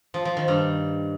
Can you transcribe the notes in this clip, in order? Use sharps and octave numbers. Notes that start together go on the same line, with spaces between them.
F3
F3
D#3
G2